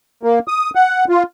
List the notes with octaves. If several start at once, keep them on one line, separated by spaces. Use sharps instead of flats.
A#3
D#6
F#5
F4